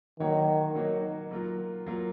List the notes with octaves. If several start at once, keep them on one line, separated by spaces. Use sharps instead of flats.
D#3 F#3 A#3 D#4 F#4 C#5
F#3 A#3 D#4 F#4 C#5
F#3 A#3 F4 A#4
F#3 A#3 F4 A#4